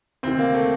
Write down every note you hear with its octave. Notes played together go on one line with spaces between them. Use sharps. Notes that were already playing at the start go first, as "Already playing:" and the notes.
D2 C3 D#3 C4
A#3
A3